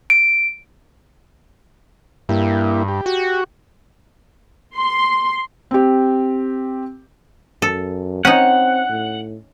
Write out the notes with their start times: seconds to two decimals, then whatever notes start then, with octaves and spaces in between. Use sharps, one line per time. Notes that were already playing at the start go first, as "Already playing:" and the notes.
0.10 D7
2.29 G2 A#3 E4 G4
2.88 G4
3.06 F#4
4.76 C6
5.71 C4 G4
7.62 F#2 A4
8.25 C4 C#4 D#4 F#5
8.89 A2